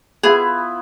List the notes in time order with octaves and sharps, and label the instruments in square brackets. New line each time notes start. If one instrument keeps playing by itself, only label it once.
[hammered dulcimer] B3 E4 F4 [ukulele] G#4